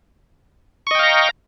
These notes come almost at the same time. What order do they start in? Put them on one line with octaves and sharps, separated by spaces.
C#6 D#5 G5 F5 A#5